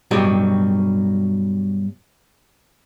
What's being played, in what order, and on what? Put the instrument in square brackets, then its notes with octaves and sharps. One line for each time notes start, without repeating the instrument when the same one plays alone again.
[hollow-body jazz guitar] G2 B2 F#3 D#4 G4